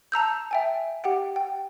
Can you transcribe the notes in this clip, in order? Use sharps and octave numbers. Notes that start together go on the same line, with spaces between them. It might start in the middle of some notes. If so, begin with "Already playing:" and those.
A5 A#5 E6 G6
E5 G5 G#5
G4 F#5 G5
G5